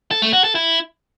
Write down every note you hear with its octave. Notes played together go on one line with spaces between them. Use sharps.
A4
A3
F#4
A4
E4